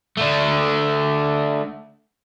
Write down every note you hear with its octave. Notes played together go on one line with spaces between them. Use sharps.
D3 A3